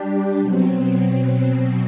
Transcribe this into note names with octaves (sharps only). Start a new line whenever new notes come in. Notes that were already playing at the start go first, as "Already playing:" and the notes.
Already playing: G3 D4 G4
B2 F#3 C4